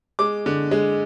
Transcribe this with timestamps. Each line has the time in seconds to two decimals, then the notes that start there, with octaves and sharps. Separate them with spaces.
0.19 G#3 D6
0.46 D3
0.71 G#3